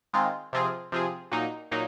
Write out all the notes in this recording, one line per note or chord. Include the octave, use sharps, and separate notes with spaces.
D#3 G#3 C4 F4
C3 F3 C4 F4 G#4
C3 F3 C4 F4 G#4
A#2 F#3 A#3 D#4
A#2 F#3 A#3 D#4